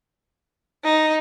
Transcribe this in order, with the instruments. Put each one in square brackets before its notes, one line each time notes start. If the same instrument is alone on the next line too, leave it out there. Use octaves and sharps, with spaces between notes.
[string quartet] D#4